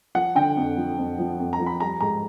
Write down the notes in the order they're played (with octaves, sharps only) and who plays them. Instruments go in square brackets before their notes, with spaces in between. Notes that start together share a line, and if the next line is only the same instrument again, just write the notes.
[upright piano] F3 F#5
D3 G5
F2
F3
F2
F3
F2
A#5
F3
B5
G3 A#5
G#2 A#5